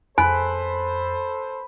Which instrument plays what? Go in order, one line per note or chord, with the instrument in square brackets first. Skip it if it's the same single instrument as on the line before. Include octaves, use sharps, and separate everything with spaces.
[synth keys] F2 [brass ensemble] A4 C5 [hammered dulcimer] B4 [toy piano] G#5